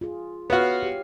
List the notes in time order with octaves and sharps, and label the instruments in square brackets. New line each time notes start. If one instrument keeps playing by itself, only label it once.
[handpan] F4 G#4
[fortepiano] B3 F#4 [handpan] C#5 F5
[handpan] G4